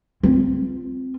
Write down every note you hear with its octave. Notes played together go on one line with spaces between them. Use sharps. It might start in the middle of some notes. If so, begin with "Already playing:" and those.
C4 F4